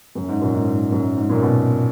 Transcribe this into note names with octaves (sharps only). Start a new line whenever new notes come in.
F#2
G#2
F#2 A#2
G#2
G#2
F#2
G#2
F#2 A#2
B2